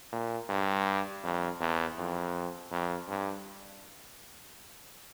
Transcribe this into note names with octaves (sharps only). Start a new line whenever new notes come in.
A#2
G2
F2
E2
F2
F2
G2